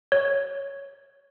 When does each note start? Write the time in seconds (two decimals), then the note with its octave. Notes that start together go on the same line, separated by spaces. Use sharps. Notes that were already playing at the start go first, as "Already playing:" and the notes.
0.12 C#5